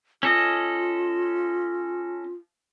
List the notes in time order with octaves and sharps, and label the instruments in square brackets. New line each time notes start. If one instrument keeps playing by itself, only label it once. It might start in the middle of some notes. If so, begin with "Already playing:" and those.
[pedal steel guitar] C#4 A4 D#5 [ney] F4